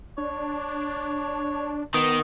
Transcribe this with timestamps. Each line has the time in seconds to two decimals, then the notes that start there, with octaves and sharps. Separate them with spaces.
0.18 D4 C#5
1.94 D#3 B3 D#6